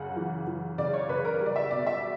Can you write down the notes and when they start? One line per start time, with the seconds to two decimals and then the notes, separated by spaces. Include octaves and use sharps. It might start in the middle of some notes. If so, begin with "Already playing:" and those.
Already playing: F#2 C#3 F#5
0.16 E3
0.47 E3
0.78 C#3 D5
0.93 C#5
1.08 C#3 B4
1.25 A#4
1.40 G3
1.46 D5
1.56 E5
1.71 B2 D5
1.87 E5